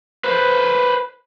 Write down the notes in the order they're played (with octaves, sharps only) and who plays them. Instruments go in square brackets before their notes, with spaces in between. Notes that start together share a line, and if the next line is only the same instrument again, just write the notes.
[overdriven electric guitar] B4 C5